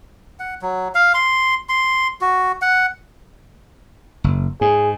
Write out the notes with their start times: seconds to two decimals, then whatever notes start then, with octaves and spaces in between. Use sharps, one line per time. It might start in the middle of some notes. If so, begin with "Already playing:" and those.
0.39 F#5
0.62 F#3
0.95 F5
1.14 C6
1.69 C6
2.21 F#4
2.62 F#5
4.24 F#1
4.61 G#2 G#4